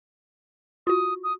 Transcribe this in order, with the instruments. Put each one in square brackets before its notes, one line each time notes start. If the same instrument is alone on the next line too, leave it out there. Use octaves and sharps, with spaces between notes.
[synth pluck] F4 F#4 [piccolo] D#6
[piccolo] D#6